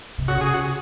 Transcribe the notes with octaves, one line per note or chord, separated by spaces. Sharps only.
C3
C#3 F#4
G#4
F#4